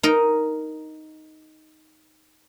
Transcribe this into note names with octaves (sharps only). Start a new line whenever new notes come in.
D#4 A#4